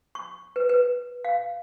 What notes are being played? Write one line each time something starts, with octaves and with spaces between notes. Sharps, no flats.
C#6
B4
B4
F5